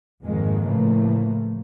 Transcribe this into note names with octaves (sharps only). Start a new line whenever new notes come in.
F2 G#2 D#3 G#3 A#3
A2 C#3 E3 F3 A3 A#3